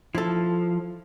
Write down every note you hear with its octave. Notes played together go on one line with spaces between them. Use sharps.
F3 E4 A4